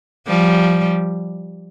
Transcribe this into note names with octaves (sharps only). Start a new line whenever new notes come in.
F3 G3